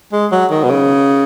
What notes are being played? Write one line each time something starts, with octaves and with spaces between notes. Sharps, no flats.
G#3
F#3
D#3
B2
C#3